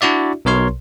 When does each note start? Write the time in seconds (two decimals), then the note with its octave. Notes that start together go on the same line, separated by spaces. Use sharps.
0.01 D4 E4 F#4 D5 E5
0.45 B1 B2 A#4 C#5 C6